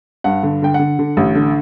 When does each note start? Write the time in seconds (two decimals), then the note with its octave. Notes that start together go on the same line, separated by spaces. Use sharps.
0.24 G2 F#5
0.43 D3
0.62 D3 G5
0.74 D3 F#5
0.99 D3
1.17 A1
1.35 D3